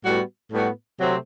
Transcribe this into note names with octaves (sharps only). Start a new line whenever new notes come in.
A2 G3 B3 F#4
A2 G3 B3 F#4
C3 F#3 A3 C4